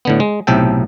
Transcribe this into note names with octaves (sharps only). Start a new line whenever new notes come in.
A2 D3 B3
G#3
B1 A2 C3 A4 G5